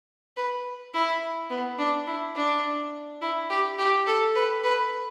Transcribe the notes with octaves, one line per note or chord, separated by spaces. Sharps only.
B4
E4
B3
D4
E4
D4
E4
G4
G4
A4
B4
B4